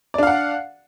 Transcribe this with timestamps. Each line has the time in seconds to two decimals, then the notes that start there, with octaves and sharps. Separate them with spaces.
0.14 D5
0.18 D4
0.23 F5
0.27 F#5